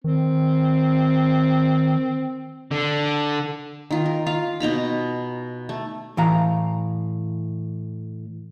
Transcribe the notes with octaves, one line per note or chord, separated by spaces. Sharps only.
D#3 C4
D3
D#3 F4
A#4
F4 F5
B2 D#4 A#5 B5
A3
A2 E3 F5 A#5